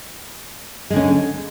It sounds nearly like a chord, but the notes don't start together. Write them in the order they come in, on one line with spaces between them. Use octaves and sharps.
G#3 D3 C#4